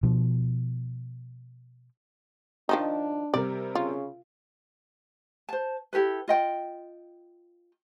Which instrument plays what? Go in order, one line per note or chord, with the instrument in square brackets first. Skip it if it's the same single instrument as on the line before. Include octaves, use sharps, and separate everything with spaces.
[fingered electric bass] B2 F3
[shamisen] D#3 F3 D#4 [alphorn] D4
[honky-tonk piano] C3 G3 A#4 [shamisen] D5
[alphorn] C#3 [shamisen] F4
[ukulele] C5 A5
E4 G4 A4 B4
F4 D#5 G5